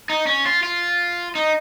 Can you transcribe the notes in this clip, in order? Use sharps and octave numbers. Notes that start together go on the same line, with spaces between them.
D#4
C#4
F4
F4
D#4